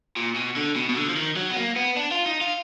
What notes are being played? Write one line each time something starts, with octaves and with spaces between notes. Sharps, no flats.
A#2
B2
D3
B2
B2
D3
F3
D#3
F#3
B3
A#3
B3
D4
F4
D#4
F4